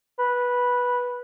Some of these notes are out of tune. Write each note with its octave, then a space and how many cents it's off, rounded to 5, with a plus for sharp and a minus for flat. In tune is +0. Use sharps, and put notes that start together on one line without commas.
B4 -10